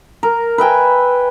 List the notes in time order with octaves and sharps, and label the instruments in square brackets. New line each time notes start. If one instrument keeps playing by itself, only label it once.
[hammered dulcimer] A#4
B4 E5 G5 G#5